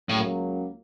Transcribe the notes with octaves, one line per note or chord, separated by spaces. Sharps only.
C#2 A2 C#3 F#3 A#3